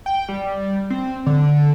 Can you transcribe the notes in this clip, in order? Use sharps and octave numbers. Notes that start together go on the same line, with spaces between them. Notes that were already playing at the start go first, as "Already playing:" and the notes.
G5
G3
C4
D3